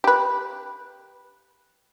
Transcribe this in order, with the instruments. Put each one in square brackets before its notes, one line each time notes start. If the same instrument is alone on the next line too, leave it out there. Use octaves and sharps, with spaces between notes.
[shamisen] G4 B4